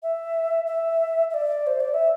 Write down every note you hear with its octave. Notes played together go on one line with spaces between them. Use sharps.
E5
E5
E5
D5
C5
D5
E5